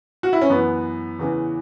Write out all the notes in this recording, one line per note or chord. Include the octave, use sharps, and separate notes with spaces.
F#4
E4
C#4
F#2 E3 B3
E2 C#3 E3